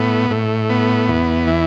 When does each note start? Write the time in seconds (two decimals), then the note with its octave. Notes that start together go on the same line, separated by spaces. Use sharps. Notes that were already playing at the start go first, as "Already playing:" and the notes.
Already playing: A2 B3
0.30 A2
0.70 B3
1.09 E2
1.47 E3